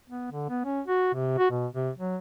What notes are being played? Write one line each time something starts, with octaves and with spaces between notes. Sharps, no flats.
B3
D3
B3
C#4
F#4
C3
F#4
B2
C3
F#3